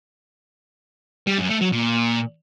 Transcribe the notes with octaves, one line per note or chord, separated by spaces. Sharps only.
G3
F#2
A3
F#3
A#2